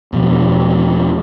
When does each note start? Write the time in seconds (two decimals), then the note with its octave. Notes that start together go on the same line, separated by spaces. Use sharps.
0.12 E2 B2 F3 B3